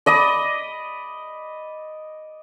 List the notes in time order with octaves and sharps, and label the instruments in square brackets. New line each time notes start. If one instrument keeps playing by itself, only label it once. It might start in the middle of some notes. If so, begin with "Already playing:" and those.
[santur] D5 D#5 B5 D#6